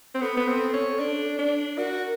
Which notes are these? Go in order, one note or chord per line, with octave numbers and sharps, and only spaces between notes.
C4
B3 A4
B3
C4
C#4
D4
D4
F#4 A#4